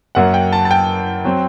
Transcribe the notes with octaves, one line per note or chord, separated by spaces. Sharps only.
F#2 F#3 A#3 F#5
G5
A5
A5
G5
F#3 C4